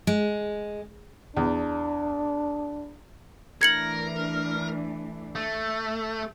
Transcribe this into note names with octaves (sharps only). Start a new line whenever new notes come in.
G#3
E2 D4
E3 A3 D4 A#4 G#6 C#7 F#7
A3